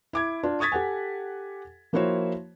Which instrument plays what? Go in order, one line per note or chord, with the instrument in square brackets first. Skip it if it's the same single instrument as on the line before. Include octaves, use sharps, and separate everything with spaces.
[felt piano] E4 D6 G#6
D4 F4
C#6 D#6 G#6 A6 B6
G4 A4 F#5 G#5
F3 A#3 E4 F#4 C5 C#5